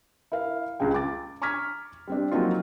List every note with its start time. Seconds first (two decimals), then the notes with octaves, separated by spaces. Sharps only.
0.32 E4 A#4 F5
0.80 C#2 C#3 G#4 G5
0.94 D6 A6
1.42 A#5 C#6 D6 F6 G#6 B6
2.07 G3 C4 D4
2.32 F3 F#3 A#3 C4 D#4 F4